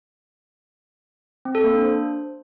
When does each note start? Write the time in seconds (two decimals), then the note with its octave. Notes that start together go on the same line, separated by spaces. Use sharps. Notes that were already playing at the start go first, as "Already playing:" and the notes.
1.45 C4
1.55 A4
1.64 A#3
1.74 D4
1.83 C5